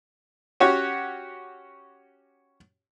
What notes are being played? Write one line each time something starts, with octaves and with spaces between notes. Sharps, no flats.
C#4 F#4 G4 C#5